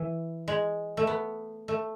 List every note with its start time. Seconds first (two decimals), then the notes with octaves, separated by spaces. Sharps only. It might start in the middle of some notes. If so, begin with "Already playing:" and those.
Already playing: E3
0.48 G#3
0.97 A3
1.07 B3
1.68 A3